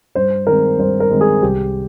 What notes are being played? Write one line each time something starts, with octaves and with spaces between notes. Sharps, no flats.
G2 C5
D#3 G#3 C4 A#4
G2 C5
A#4
D#3 G#3 C4
G#4
C2 G4